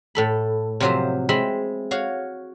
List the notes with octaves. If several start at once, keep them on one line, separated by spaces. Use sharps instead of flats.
A2 A4 B5
C3 F3 F#3 C5 E5
G#3 C4 E4 E5 B5 C6
F#4 C#5 F5